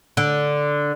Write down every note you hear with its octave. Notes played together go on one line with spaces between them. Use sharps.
D3